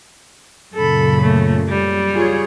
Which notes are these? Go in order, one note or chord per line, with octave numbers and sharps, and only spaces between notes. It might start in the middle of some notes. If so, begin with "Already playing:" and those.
F#2 A#2 C#3 A4 B5
A3
G3
F4 G#4 C#5